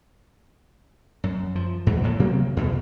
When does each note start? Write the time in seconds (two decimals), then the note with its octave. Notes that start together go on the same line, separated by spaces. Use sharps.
1.24 F#2
1.55 F3
1.87 E2 G#2 B2
2.04 A2 A#3
2.20 C3 F#3 A#3 C4
2.57 E2 B2